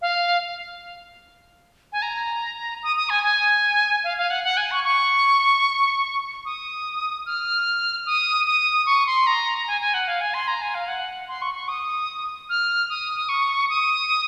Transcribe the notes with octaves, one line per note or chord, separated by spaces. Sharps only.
F5
G#5
A#5
D#6
D#6
G#5
G#5
F5
F5
F#5
F#5
G#5
C#6
C#6
D#6
F6
D#6
D#6
C#6
C6
A#5
G#5
G#5
F#5
F5
G#5
C6
A#5
G#5
F5
F#5
C6
C#6
C#6
D#6
F6
D#6
C#6
D#6